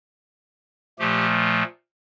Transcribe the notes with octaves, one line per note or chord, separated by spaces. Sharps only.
A#2 F3 A3 G4